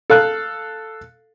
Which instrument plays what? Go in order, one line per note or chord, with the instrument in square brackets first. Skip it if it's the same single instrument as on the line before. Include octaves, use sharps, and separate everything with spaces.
[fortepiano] A4 F5 F#6